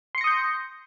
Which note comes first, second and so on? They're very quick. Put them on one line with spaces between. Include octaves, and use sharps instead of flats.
C6 C#7 A#6 D#6 G6